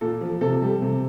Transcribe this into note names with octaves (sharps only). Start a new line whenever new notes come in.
A#2 A4
F3
C3 A4
G3
C3